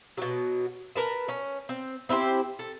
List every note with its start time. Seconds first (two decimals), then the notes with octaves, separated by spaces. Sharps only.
0.17 B2 F#3
0.96 A#4 B4 A5
1.28 C#4
1.69 C4
2.09 C4 E4 G4 C5
2.59 A4